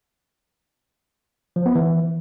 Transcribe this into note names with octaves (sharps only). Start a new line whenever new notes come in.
F3
B3
E3